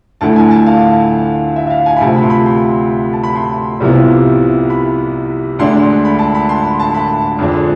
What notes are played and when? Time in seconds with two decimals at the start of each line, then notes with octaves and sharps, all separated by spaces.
0.21 D2 D3 A3 E4 A5
0.36 G#5
0.51 A5
0.66 F5
1.56 E5
1.67 E5
1.70 F5
1.86 G#5
1.97 B5
2.01 D2 C3 F3 A5
2.16 B5
2.23 C6
2.30 B5
2.46 C6
3.13 A5
3.24 B5
3.36 C6
3.80 C2 C3 F3 B3 E4
4.70 B5
5.59 D2 D3 G#3 D4 C6
6.05 B5
6.19 A5
6.35 B5
6.49 C6
6.64 B5
6.80 A5
6.94 B5
7.39 F2 D3 G#3 D4